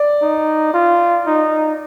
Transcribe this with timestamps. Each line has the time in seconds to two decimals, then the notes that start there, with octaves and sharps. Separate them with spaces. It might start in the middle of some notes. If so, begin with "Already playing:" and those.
Already playing: D5
0.22 D#4
0.74 F4
1.26 D#4